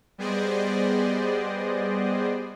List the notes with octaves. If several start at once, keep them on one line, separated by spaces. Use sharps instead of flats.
G3 B3 G#4 C5 D5 D#5